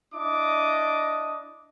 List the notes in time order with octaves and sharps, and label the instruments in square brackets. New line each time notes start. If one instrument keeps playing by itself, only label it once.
[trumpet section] D4 E4 D#5 D6 D#6